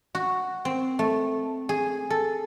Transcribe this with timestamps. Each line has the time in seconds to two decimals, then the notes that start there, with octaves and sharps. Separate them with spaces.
0.15 F#4
0.65 C4
0.99 A3
1.69 G#4
2.10 A4